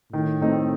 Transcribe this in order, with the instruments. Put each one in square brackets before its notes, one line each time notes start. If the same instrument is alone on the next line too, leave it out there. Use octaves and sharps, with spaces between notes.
[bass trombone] A2 [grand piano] D#3
[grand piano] A3 C4 D#4